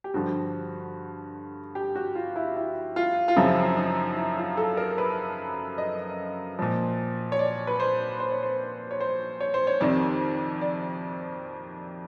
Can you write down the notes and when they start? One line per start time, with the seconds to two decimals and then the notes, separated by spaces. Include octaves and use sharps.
0.04 G4
0.14 G2 D3 F3 F#4
1.75 G4
1.95 F#4
2.15 F4
2.36 E4
2.56 E4
2.96 F4
3.28 F4
3.36 F#2 C#3 F3 E4
3.77 D#4
4.17 E4
4.37 F4
4.57 A4
4.77 A#4
4.98 B4
5.78 D#5
6.59 A#2 F3
7.32 C#5
7.39 D5
7.67 B4
7.80 C5
8.20 C5
8.31 C#5
8.43 C5
8.91 C#5
9.00 C5
9.41 C#5
9.54 C5
9.67 C#5
9.81 F2 C3 D#3 D5
10.61 D5